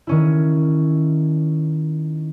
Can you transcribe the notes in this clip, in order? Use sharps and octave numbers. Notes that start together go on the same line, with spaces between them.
D#3 C#4 E4